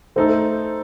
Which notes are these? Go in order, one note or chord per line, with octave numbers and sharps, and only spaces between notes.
A3 D#4 A4 C5